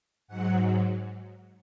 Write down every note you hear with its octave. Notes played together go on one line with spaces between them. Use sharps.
G#2 F#3 F#5